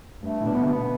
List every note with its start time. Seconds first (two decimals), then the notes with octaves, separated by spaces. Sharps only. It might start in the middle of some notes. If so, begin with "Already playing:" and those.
0.23 G2 A3
0.41 A2
0.45 B2 D4
0.55 B3
0.61 D3
0.64 B2 A3
0.73 B3